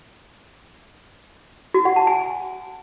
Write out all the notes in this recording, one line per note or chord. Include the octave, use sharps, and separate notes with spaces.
F#4
F#5
A5
G#5